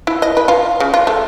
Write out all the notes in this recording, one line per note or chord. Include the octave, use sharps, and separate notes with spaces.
E4
D#5
B4
F4
C#3
F4
A3